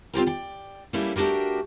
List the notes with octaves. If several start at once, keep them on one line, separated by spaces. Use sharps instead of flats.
C4 F4 G4 A#4
D5 G5
G3 A3 A#3 C#4 E4
A3 D4 F#4 G4 A#4